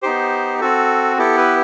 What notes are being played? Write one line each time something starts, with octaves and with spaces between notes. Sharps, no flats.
B3 D#4 G4 C5
C4 F#4 A4
B3 E4 G4 A4
B4